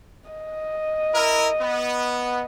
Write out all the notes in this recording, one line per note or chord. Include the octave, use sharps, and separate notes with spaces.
D#5
E4 A#4
B3